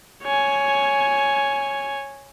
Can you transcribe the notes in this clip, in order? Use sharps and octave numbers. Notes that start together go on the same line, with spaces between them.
C#5 G#5